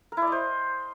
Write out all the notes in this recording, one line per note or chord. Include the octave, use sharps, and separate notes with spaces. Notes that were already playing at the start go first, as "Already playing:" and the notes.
A#4
E4
D5
D#5
C5